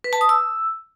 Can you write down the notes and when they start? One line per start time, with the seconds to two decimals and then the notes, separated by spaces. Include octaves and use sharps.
0.04 B4
0.13 A5
0.21 D#6
0.29 E6